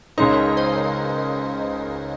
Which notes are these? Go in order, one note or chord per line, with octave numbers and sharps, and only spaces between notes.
C#2 C#3 G#3 D#4 A#4 C#5
C5 D#5